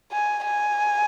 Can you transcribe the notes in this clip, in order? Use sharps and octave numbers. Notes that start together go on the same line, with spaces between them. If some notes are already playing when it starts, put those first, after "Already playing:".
G#5
G#5